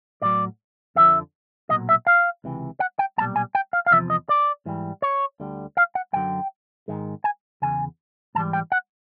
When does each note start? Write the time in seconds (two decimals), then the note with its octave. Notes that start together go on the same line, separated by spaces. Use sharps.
0.22 A2 F#3 D5
0.95 F2 D3 F3 E5
1.69 B1 A#2 F#3 D#5
1.89 E5
2.07 F5
2.44 C#2 C3 E3
2.80 F#5
2.99 G5
3.18 B1 A#2 G3 A5
3.36 G#5
3.55 G5
3.73 F5
3.86 F5
3.91 E2 C3 F3 E5
4.10 D#5
4.29 D5
4.66 G#2 E3 G3
5.02 C#5
5.40 D2 D3 G3
5.77 F5
5.95 F#5
6.13 F#2 D3 F#3 G5
6.88 G#2 D#3 G#3
7.24 G#5
7.62 E2 C#3 G#5
8.35 G#2 E3 G3 A5
8.53 G5
8.72 F#5